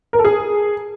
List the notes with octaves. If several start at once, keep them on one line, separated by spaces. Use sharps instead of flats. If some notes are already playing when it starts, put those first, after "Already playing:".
A#4
A4
G#4